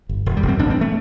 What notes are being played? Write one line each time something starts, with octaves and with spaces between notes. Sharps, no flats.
G1
E1
G3
E1
C4
A1 D4
C4
A3